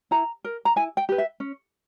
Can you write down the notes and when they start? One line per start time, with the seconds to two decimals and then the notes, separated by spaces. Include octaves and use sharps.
0.11 E4 A#5
0.44 A#4
0.65 A#5
0.76 E4 G#5
0.97 G5
1.09 G4 B4
1.18 E5
1.40 C#4